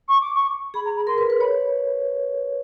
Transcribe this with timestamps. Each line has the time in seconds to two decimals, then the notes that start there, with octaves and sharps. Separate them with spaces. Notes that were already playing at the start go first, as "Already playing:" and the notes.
0.08 C#6
0.21 D6
0.34 C#6
0.74 G#4 B5
0.85 A#5
0.97 B5
1.07 A#4 C6
1.18 B4
1.30 B4
1.40 C#5 B5